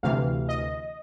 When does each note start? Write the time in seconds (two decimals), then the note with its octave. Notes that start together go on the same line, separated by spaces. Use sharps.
0.03 D2 C3 E3 F5
0.49 D#5